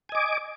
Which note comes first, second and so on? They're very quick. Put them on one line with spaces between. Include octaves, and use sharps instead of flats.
G#5 D#5 D6